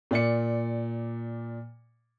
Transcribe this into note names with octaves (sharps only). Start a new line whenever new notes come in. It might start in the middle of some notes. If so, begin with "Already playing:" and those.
A#2 D5 C#7